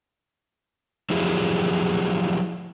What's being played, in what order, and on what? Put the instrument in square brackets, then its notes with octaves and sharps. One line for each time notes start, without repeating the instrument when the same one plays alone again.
[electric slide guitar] F3 F#3 E4 G4 G#4